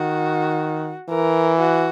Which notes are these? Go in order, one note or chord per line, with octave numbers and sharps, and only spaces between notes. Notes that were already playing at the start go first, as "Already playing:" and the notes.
Already playing: D#3 F#4
E3 A#4
F#4